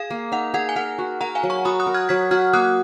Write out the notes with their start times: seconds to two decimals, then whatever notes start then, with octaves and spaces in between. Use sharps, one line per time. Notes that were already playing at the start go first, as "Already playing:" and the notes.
Already playing: G#4 F5
0.10 A#3
0.32 D#4 F#5
0.54 G#4 F#5
0.69 G#5
0.76 A#4 F#5
0.98 F#4
1.21 A#4 F#5 A#5
1.35 F5 G#5
1.43 F#3
1.50 A#5 C#6
1.65 F#4 B5 D#6
1.80 D#6 F#6
1.87 A#4
1.94 F6 G#6
2.09 F#3 G#6 B6
2.31 F#4 F6 G#6
2.53 A#3 D#6 F#6